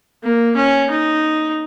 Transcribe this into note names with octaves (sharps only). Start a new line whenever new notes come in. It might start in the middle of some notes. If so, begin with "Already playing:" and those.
A#3
C#4
D#4